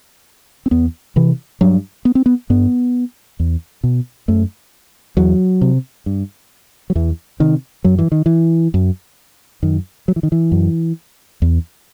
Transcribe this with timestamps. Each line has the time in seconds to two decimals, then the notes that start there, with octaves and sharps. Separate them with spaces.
0.66 C4
0.71 E2 B3
1.16 C3 E3
1.61 G2 F#3
2.05 B3
2.15 C4
2.26 B3
2.50 G2 B3
3.40 E2
3.84 B2
4.28 F#2 A3
5.17 E2 F#3
5.61 C3
6.06 G2
6.90 F#3
6.95 E2 E3
7.40 C3 D#3
7.84 F#2 F#3
7.99 E3
8.12 D#3
8.26 E3
8.74 F#2
9.63 F#2 D#3
10.08 F#3
10.16 E3
10.23 D#3
10.32 E3
10.52 F#2
11.42 E2